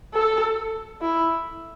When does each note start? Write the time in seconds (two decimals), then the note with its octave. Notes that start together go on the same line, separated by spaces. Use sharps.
0.14 A4
1.01 E4